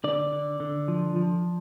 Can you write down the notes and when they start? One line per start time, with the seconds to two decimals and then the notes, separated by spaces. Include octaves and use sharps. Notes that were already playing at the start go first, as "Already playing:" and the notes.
0.04 D3 D5
0.32 D3
0.60 D3
0.88 F3
1.16 F3